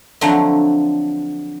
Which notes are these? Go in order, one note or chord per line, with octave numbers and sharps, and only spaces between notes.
D3 F3 F#3 A3 C4